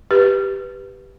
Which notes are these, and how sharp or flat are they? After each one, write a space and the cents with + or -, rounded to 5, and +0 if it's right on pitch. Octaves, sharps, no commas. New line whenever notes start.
G4 +0 B4 -5